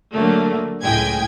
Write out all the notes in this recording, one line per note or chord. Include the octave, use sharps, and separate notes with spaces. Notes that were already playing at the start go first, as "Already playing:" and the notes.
D3 F#3 A3 A#3
C#2 A2 G#3 G5 G#5 G#6